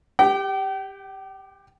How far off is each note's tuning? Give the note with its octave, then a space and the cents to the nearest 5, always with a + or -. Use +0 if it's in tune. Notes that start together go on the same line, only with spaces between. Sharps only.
G4 +15 G5 -35